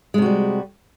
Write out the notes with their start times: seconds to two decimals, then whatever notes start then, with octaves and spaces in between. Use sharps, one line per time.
0.14 G#3
0.18 C3
0.22 F#4
0.26 G3